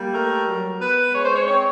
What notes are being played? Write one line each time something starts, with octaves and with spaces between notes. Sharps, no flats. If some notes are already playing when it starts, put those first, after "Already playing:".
Already playing: G3 A#3
A3 A#4
F#3
B3 B4
G#3 C#5
C5
C#5
C4 C#5